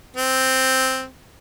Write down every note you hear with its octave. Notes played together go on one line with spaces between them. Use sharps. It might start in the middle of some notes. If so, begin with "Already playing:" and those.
C4